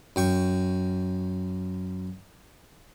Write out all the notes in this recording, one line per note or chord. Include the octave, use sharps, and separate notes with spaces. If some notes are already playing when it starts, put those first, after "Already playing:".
F#2 G5 C#6